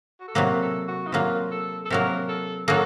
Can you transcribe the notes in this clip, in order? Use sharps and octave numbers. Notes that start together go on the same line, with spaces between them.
F#4
A4
C3 F#3 A#3 A#4
A4
F#4
D#4
C3 F#3 A#3 F4
A4
A4
C3 F#3 A#3 A#4
A4
F#3 A#3 A4